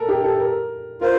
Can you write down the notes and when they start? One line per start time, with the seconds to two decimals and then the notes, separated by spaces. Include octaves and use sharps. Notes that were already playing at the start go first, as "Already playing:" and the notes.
Already playing: A4 A#4
0.09 G4
0.24 A4
0.39 A#4
1.01 F4 A#4 C5